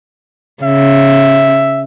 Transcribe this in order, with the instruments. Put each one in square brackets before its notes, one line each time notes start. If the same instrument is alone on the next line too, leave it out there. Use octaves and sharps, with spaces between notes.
[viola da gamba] C#3 [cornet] E5